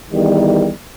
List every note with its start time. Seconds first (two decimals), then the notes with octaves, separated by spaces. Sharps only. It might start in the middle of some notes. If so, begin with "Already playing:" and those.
0.11 E2 D#3 G3